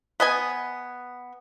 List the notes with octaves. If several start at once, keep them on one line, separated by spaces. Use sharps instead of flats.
B3 D#5 G#5